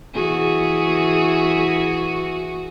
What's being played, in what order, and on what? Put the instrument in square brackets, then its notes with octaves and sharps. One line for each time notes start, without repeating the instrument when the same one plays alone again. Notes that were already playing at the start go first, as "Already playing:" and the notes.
[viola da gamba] E3 F#4 G#4